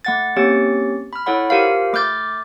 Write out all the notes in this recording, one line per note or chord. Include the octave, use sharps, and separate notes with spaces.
A3 F#5 A6
A#3 C4 C#4 G4 C#5 A6
B5 F6
E4 A4 C#5 F#5 B5
F4 G4 A#4 C5 E5 F5
A3 D6 F6 G6 A6